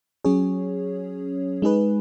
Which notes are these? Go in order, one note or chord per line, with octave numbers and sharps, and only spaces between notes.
F#3 C#4 G#4 C#5
G#3 D#4 G#4 B4